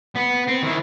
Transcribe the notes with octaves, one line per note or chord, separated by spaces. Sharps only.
B3
C4
D#3 E4